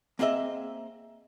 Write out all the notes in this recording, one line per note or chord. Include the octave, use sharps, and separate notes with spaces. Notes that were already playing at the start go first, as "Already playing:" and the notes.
A#3 C4 G#4 D#5 E5